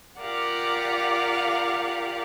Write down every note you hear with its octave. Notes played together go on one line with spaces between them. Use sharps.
F4 G4 A#4 D5 F5 F#5